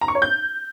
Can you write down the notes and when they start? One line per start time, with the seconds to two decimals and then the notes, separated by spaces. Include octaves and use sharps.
0.01 A#5
0.08 C#6
0.15 C#5
0.22 G6